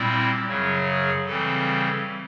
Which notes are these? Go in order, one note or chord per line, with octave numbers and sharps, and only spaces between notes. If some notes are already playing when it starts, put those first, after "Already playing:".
Already playing: A#2 G3 C4 E4
F#2 C#3 F#3
G#4
C#3 E3 G3 C4 A4